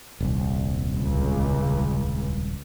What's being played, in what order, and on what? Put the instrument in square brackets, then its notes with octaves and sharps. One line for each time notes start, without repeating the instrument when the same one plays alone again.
[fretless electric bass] D#1 C2
[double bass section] C#2